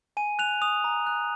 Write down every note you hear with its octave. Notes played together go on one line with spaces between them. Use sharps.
G#5 D#7
F#6 F7
D#6 F7
A#5
F#6